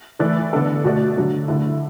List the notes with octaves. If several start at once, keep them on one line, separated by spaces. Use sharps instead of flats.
E3 A3 E4 D5
D3 B3 D4 A4 D5
B2 A3 F#4 D5
D3 F#3 D4
D3 A3 E4